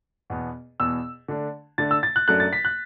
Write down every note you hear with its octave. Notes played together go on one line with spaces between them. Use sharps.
E2 B2 B3
E2 B2 B3 E6
D3 A3 D4
D3 A3 D4 A6
E6
A6
F#6
F#2 F#3 A3 D4 F#6
A6
B6
F#6